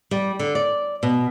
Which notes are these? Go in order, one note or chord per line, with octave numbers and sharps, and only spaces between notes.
G3
D3
D5
B2